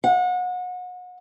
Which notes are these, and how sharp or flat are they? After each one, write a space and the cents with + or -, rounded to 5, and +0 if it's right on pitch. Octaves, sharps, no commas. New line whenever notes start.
F#5 -35